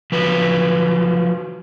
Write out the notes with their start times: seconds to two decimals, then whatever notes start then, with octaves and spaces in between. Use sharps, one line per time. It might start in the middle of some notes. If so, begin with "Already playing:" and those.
0.12 F3 F#3 B4